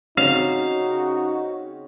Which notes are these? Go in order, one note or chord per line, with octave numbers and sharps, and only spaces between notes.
C#3 C4 C#4 D#4 F#4 F5